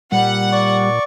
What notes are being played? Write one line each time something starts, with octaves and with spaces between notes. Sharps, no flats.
A#2 G3 F#5
D5 C#6